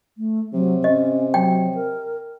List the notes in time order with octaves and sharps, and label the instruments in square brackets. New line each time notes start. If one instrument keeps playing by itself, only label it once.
[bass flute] A3
[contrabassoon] C3 [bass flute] F#3
[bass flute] C#4 [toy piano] D#5
[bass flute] F#3 [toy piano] G5
[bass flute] A#4